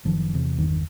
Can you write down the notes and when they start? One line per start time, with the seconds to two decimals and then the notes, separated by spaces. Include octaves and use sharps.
0.05 F#1 D#3 F3
0.34 E2 C3
0.58 G1 E2 D#3